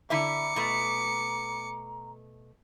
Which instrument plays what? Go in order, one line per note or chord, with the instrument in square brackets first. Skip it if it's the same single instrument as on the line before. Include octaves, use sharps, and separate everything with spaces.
[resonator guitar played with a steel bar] D3 E4 E5 [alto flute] A#5 [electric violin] D6 C#7
[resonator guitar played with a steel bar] B2 A3